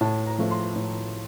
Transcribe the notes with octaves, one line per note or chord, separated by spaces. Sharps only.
A2 A5
A#5
F3 A3
C6
A2